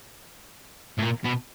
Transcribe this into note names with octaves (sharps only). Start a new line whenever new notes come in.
A2
A#2
B2